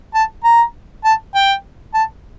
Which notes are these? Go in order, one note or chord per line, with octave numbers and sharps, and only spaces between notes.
A5
A#5
A5
G5
A5